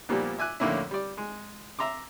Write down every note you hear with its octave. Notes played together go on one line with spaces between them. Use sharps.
A#2 F3 G3 A#3 B3
E5 G#5 D6 F#6
F2 A2 D3 A#3 C#4 E4
G3 D5
G#3
E5 A#5 C6 D6